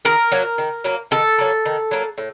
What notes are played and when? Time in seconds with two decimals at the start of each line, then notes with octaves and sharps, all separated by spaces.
0.05 D#3 A#4
0.32 F#3 A#3
0.58 D#3
0.84 F#3 A#3
1.11 D#3 A4
1.39 F#3 A#3
1.65 D#3
1.91 F#3 A#3
2.18 A2